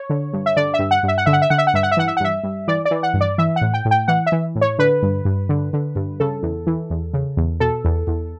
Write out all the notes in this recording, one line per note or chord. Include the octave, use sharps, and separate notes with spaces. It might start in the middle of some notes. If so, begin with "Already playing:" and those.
Already playing: C#5
D3
G2
E5
D3 D5
E5
G2
F#5
G2 E5
F#5
D3 E5
F#5
E5
D3 F#5
E5
F#5
G2 E5
F#5
E5
E3 F#5
E5
F#5
G2 E5
G2
E3 D5
D5
E3
F#5
G2
D5
E3 E5
F#5
A2
G5
A2
G5
E3 F#5
E5
E3
A2
C#5
D3 B4
G2
G2
D3
D3
G2
C#3 A4
E2
E3
E2
C#3
E2
B2 A4
E2
E2